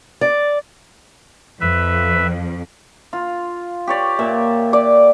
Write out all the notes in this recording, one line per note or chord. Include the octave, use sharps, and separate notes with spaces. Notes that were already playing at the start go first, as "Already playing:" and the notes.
D5
F2 B4 E5
F4
G4 C#5 D5
A#2 E5
D5